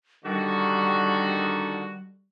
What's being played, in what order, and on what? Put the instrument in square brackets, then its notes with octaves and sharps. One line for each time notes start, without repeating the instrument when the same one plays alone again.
[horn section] D3 D#3 F#4 [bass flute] G3